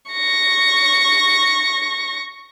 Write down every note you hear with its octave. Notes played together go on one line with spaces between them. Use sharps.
C#6 A#6